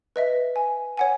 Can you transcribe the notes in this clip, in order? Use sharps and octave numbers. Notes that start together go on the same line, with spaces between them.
B4 D#5 E5
G#5
C#5 F#5 G#5